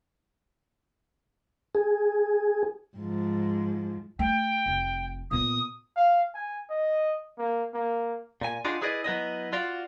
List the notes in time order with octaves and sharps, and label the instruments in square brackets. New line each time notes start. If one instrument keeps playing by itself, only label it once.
[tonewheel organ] G#4
[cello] G#2 F3
[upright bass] A3 [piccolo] G5
[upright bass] F1
[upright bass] A#2 B3 [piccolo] D#6
[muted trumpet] F5
G#5
D#5
A#3
A#3
[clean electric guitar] A#2 G#5
D4 D#4 F4 F#4 G#4
E4 G#4 B4 D5 D#5
F#3 B3 E4 D#5
F4 F#4 D5 F5